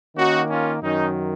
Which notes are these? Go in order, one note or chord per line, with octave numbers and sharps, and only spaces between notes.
D#3 A#3 C#4 D#4 F#4
C#4 F4
F#2 D#3 F#3 C#4 D#4